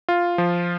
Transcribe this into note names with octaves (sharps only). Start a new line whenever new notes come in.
F4
F3